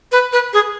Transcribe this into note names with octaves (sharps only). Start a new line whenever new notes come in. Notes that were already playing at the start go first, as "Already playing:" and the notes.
B4
B4
G#4